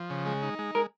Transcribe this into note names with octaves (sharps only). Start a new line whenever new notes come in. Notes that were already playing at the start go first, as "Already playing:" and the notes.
Already playing: F3
C#3
G#3
D#4
G#3
G#3 A#4